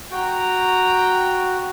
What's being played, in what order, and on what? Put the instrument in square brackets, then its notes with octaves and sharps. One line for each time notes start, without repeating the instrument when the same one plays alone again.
[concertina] F#4 [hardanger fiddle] G5 A#5